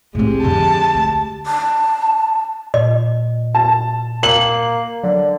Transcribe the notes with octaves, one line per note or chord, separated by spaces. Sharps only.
A2 G#3 C4 G4
F2 D3 A5
D2
A5
A#2 D#5
A5
A#3 G5 F#7
D3 F#3